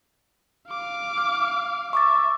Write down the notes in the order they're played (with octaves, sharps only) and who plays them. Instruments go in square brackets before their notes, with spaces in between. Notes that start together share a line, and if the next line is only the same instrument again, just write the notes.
[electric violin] F5 D6
[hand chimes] F6
[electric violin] E5 [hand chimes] C#6 D6 A6